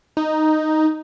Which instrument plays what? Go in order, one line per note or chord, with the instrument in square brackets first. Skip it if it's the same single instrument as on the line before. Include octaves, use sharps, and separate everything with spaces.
[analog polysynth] D#4